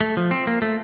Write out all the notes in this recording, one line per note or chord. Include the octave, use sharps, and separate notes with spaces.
A3
F3
C4
A#3
A3